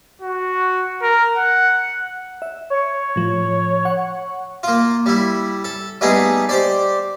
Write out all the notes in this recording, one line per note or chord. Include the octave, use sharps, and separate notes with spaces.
F#4
A#4
F#5
E5
C#5
A2 F3
F#5 C#6
A#3 F4
G3 E4
A4
G3 A3 B3 D#4 G#4
G4 C5 D5